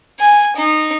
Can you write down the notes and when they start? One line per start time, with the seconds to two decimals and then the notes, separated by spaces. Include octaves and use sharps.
0.19 G#5
0.56 D#4